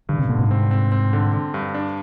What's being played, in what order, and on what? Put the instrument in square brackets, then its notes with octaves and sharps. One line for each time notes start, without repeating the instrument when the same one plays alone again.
[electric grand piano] G2 [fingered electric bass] D3
[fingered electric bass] C3
[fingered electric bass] A#2 [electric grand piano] D3
[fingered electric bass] G#2 C3
[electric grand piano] C4
C4
C4
D3
D3
G2
D4